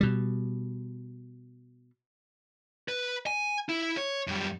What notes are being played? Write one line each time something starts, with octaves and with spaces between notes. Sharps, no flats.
B2 G3
B4
G#5
E4
C#5
F#2 G3